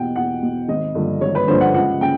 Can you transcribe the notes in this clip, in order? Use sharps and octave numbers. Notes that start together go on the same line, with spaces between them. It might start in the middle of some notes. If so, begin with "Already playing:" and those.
Already playing: E2 B2 F#5 G5
E2 F#5
B2
G#1 D#5
G2 D3 F3
G#1 C#5
B4
G2 D3 F3 C5
F#5
C#2 F#5
C#3 G5